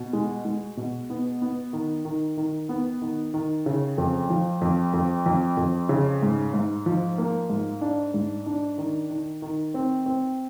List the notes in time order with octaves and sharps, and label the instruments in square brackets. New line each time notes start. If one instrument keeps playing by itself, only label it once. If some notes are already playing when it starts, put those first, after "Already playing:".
Already playing: [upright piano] B2
G#3
G#3
B2
B3
B3
D#3
D#3
D#3
B3
D#3
D#3
C#3
F2
F3
F2
F2
F2
F2
C#3
G#2
G#2
F3
A#3
G#2
D4
G#2
D4
D#3
D#3
D#3
C4
C4